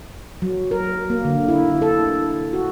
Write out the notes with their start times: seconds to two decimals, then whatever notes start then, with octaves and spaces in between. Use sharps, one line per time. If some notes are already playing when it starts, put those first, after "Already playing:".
0.42 F#3
0.71 A#4
1.10 A#3
1.25 D3
1.48 E4
1.82 A4
2.53 F#4